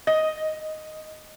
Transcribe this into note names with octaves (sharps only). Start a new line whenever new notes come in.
D#5